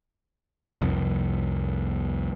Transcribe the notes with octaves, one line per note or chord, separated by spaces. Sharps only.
C2 F2